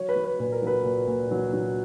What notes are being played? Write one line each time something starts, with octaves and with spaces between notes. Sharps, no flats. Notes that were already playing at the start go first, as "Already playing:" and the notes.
Already playing: F#3 C#5
B4
F#3
B4
A#2 B4
A#4
F#3 B4
A#2
A#2
F#3
F#3